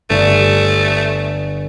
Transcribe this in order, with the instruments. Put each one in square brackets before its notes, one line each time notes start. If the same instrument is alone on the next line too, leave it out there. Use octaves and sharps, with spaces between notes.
[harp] G1 [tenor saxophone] A3